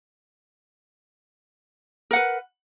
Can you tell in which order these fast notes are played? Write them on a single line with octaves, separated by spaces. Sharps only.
A#4 F#5 B4